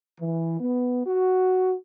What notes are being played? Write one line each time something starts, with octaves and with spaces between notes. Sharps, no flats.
E3
B3
F#4